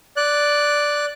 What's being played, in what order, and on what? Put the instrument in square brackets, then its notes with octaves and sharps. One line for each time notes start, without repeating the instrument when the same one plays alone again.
[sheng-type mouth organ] D5 F#6